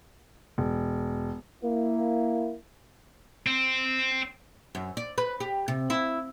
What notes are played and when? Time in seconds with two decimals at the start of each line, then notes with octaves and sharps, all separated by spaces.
0.58 E1
1.63 A#3 E4
3.46 C4
4.75 F#2
4.97 D5
5.18 B4
5.40 G4
5.68 C3
5.90 E4